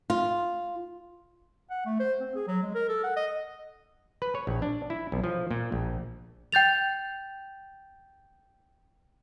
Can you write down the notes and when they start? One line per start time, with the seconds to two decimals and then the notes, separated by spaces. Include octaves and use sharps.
0.10 F4
1.70 F#5
1.86 A3
2.00 C5
2.20 C4
2.35 G#4
2.48 F#3
2.62 G#3
2.75 A#4
2.88 A4
3.04 F#5
3.16 D#5
4.22 B4
4.35 C#5
4.47 A#1
4.62 D4
4.90 E4
5.12 B1
5.24 F3
5.51 A#2
5.72 A#1
6.52 G5 G6 A6 F7